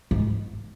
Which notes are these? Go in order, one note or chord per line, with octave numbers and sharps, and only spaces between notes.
G#2